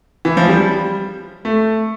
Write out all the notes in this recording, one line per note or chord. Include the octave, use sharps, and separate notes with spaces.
E3
F3
G3
A3